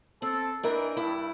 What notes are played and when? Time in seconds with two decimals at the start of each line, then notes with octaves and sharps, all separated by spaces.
0.22 C4 A4
0.63 E3 D4 D#4 A#4
0.97 G2 E4